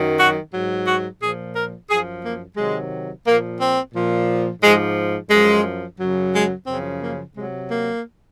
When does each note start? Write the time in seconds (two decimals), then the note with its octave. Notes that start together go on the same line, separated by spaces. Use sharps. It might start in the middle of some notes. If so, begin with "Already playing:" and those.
Already playing: F#2 D#3 F#3
0.18 F#4
0.53 G#2 F#3
0.86 F#4
1.20 A#2 F3 G#4
1.55 A#4
1.89 F#2 F3 G#4
2.23 A#3
2.57 C3 D#3 F#3 G#3
3.26 A#2 F3 A#3
3.60 C4
3.94 A#2 F3
4.62 G#2 F3 G#3
5.30 F#2 F3 G#3
5.99 F#2 C#3 F#3
6.33 G#3
6.67 F#2 C#3 F3 C4
7.02 A#3
7.35 C3 F#3 G#3
7.70 A#3